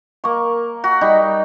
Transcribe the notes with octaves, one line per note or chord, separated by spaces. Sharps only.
A#3 C#6
F#4
G3 D#4 B5